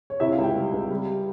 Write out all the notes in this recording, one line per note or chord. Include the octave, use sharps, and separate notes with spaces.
C#5
C3 E4 E5
F4 F5
C#2
G4 G5
G3
C#2
G3